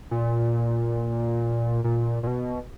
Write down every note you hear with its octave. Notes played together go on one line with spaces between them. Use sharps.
A#2
A#2
A#2
B2